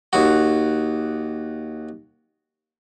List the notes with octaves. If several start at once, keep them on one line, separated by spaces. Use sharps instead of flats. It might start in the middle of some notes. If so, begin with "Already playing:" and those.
D#2 F#4